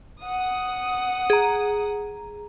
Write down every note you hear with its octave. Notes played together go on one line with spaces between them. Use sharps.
F#5 D#6
G#4 A#5